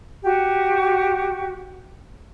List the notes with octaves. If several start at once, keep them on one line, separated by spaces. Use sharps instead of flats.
F#4 G4